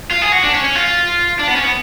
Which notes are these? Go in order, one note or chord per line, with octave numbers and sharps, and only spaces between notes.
F4
G#4
F#4
D4
C#4
C#4
F4
D4
B3
C#4
B3